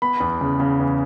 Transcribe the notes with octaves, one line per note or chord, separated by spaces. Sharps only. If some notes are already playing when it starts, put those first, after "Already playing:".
B3 B5
E2
C#3
C#3
E2